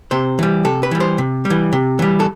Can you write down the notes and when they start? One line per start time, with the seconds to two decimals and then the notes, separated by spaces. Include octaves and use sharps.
0.11 C3 C5
0.39 E3 G3
0.65 C3 A4
0.83 B4
0.91 E3 G3
1.00 C5
1.18 C3
1.45 G3
1.50 E3
1.73 C3
1.99 E3 G3
2.20 A4